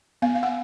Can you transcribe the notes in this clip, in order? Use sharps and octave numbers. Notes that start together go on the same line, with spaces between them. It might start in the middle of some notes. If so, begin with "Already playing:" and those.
B3 F5
F5
F#5